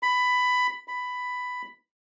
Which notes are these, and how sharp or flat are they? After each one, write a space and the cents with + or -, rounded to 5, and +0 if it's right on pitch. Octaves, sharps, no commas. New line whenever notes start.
B5 +15
B5 +10